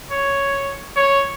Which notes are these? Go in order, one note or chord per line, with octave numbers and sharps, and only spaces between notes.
C#5
C#5